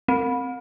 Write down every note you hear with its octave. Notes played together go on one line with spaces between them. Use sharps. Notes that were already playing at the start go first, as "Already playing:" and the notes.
C4